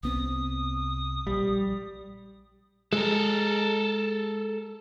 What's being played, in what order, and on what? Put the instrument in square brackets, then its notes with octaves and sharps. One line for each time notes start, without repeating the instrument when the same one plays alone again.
[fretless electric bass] C2 B3 C4 [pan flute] D#6
[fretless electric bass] A#1 [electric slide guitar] G3
[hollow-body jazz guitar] G#3 [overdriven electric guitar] A4 A#4